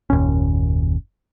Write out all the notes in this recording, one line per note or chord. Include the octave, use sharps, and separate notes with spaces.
F#1 D#2 A#2 C#4